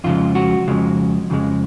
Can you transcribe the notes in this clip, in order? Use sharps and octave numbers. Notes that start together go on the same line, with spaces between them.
F2 C#3 F3 G#3 F4
F#4
F2 C#3 F3 G#3
F2 C#3 F3 G#3